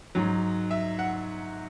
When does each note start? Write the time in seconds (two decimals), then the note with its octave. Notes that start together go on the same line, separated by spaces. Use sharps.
0.15 G#2 F#3
0.71 E5
0.99 F#5